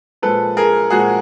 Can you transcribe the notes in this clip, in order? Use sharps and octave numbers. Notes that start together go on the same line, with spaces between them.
A#2 F3 G#3 A4 B4
G#4 A#4
A#2 F3 G#3 F#4 G#4